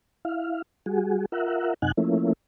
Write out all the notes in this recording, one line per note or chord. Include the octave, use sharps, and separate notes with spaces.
E4 F5
G3 F#4 G#4
F4 A#4 E5 F#5
F#2 C3 D#4 F#5 G#5 F#6
F3 A3 A#3 C#4 E4